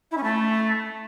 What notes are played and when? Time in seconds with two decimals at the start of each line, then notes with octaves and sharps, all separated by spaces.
0.11 E4
0.17 C#4
0.23 A3